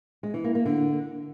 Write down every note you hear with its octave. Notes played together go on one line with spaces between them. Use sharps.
G#3
E3
A#3
A#3
D3